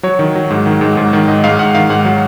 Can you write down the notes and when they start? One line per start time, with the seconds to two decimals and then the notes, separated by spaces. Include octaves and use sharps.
0.03 F#3 C#5
0.19 D#3
0.35 F#3
0.50 G#2
0.66 D#3
0.81 G#2
0.97 G#2
1.13 D#3
1.28 G#2 D#5
1.44 G#2 F5
1.59 G#2 F#5
1.74 D#3 F5
1.90 G#2 F#5
2.05 F#3